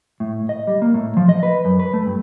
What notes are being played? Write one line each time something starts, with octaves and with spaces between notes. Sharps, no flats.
A2
D#5
G3
A#3
A2
F3
D#5
B4
F#2
B4
A3
G2